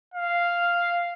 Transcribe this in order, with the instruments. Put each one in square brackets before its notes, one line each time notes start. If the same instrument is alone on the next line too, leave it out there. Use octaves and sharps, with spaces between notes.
[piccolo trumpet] F5